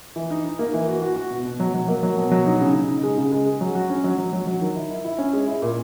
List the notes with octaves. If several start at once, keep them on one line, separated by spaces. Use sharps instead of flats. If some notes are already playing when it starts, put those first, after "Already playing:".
E3
D#4
D#4
A#3
E3
F#4
F#4
F#4
B2
B2
F#3
F#3
A#3
F#3
B2
F#3
D#4
C#3
C#3
D#4
G#3
C#3
G#3
G#3
F#3
F#4
C#4
F#3
F#3
F#3
F#3
D#3
E4
E4
E4
C#4
G#3
E4
A#2